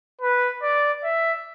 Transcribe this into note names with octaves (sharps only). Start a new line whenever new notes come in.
B4
D5
E5